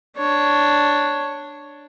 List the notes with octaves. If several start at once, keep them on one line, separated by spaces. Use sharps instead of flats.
D4 C#5